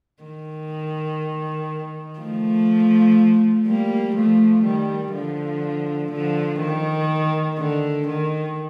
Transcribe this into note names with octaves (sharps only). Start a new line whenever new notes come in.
D#3
F3 A3
G3 A#3
F3 A3
D#3 G3
D3 F3
D3 F3
D#3
D3
D#3